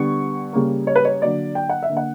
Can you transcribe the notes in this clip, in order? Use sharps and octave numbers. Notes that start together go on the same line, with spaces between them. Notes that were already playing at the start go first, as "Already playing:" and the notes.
Already playing: D3 G3 B3 C#6
C#3 G3 A#3
C#5
B4
C#5
D3 F#3 A#3 D5
G5
F#5
E5
D3 A#3
F#5